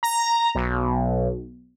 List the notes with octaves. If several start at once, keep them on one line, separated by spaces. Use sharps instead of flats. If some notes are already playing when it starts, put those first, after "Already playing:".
A#5
B1